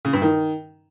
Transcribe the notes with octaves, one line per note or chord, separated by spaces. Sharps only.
C#3
G2
D#3